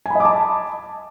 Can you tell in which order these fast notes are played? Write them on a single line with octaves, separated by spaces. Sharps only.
G#5 B5 D#5 D6 A5